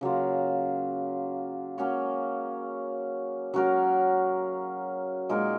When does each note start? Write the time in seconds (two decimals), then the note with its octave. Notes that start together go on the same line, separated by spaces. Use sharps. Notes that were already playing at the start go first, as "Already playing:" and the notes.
0.01 C#3 F#3 A#3 F4
1.78 A#3 C#4 F#4 C#5
3.54 F#3 C#4 F#4 A#4
5.29 A#2 G#3 D#4 A#4